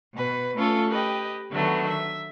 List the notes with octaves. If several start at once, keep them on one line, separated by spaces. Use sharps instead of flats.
B2 B4
A3 C#4 F4 A4
G4 B4 D#5 G5
D3 D#3 F#3 A3 B3
E5